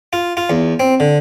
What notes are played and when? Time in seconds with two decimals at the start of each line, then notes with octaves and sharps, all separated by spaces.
0.13 F4
0.37 F4
0.50 E2
0.80 C4
1.00 D3